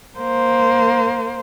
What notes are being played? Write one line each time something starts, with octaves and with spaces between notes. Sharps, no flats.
A#3 C5